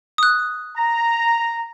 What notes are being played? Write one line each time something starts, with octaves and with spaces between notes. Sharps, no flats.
D#6 F#6
A#5